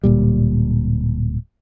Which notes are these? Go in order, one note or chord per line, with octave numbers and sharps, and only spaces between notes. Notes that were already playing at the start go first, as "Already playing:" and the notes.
D1 A#2 G3